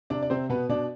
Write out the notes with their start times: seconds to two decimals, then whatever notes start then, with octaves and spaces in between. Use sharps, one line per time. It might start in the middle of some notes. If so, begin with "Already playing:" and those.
0.10 C3 D4 D5
0.23 D5
0.30 C3 C4 C5
0.49 B2 B3 B4
0.69 B2 D4 D5